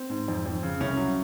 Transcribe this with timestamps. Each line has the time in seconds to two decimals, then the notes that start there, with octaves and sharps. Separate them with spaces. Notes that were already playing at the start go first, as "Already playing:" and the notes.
Already playing: C4
0.10 G#2
0.28 F2
0.46 F2
0.63 C#3
0.80 C2 C#4
0.97 F#3